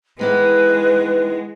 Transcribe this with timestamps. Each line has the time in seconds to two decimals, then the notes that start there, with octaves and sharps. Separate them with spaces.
0.19 D#3 E3 G#3 B3 B4